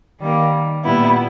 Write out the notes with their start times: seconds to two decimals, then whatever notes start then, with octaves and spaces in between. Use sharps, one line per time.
0.20 D#3 G3 A#3
0.84 A#2 G3 B3 E4